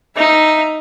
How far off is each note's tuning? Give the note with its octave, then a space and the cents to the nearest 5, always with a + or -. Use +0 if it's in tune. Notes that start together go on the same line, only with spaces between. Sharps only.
D#4 +0 E5 +5